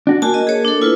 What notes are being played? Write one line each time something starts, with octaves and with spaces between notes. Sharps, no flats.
D4 F#4
A#3 F#4 G#5 A5
D#5
G#4 C#5
D4 A4
E4 F4 B4